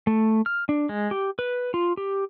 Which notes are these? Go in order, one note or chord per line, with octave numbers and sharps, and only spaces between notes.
A3
F6
D4
G#3
G4
B4
F4
G4